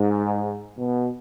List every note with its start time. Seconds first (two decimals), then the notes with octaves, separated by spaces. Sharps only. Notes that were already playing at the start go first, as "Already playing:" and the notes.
Already playing: G#2
0.77 B2